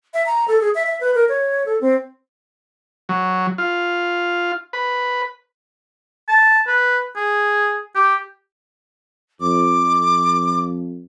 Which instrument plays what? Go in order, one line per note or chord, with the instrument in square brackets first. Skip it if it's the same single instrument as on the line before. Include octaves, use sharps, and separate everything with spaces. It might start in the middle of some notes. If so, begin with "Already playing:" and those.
[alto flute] E5
A#5
A4
G#4
E5
E5
B4
A#4
C#5
A4
C4
[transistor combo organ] F#3
F4
B4
[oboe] A5
B4
G#4
G4
[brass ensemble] F2 [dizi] D6